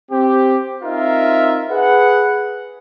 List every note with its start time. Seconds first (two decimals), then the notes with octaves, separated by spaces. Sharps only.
0.12 C4 G4
0.83 C4 D#4 F4 A#4 E5
1.70 G#4 B4 F#5